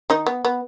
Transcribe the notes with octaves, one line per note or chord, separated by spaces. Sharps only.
D#3 D#4
B3
B3